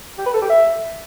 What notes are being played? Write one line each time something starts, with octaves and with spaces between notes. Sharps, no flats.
G4
B4
A4
G4
E5